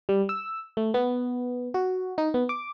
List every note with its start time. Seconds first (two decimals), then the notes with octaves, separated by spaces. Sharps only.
0.09 G3
0.29 E6
0.77 A3
0.94 B3
1.74 F#4
2.18 D#4
2.34 B3
2.49 D6